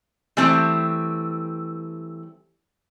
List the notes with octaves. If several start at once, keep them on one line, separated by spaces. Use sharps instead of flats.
E3 G3 A3 C4